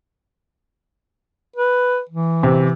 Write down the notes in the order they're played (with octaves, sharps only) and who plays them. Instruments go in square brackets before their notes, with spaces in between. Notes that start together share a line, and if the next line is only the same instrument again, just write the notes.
[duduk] B4
E3
[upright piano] C3